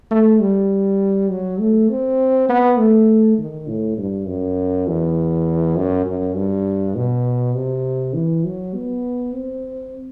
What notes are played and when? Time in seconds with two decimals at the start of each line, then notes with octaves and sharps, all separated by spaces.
0.11 A3
0.40 G3
1.29 F#3
1.60 A3
1.89 C4
2.49 B3
2.78 A3
3.38 D#3
3.68 A2
3.98 G2
4.27 F#2
4.87 E2
5.76 F#2
6.06 F#2
6.36 G2
6.95 B2
7.55 C3
8.14 E3
8.44 F#3
8.74 B3
9.33 C4